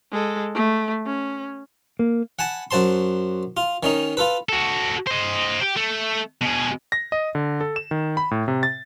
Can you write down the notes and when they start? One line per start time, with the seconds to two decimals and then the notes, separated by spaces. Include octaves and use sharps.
0.11 G#3 A4
0.55 A3
1.06 C#4
1.99 A#3
2.39 F#5 G#5 A5 B5
2.71 F#2 F#4 C5 A5 C6
3.57 F4
3.83 D#3 C#4 D#4
4.17 F4 A4 B4
4.49 F#4 A4
5.07 C5 D#5
5.62 G4
5.77 A3
6.43 B2 G#4
6.92 A#6
7.12 D#5
7.35 D3
7.61 A4
7.76 E7
7.91 D#3
8.17 B5
8.31 A2
8.48 C3
8.63 A6